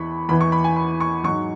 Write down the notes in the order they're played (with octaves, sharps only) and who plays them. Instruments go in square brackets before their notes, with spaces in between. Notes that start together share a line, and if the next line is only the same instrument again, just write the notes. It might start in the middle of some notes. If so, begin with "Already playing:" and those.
Already playing: [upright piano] E2 E3 B5 C#6
E2 E3 B5
C#6
B5
G#5
B5
C#6
G#2 F#3 C#6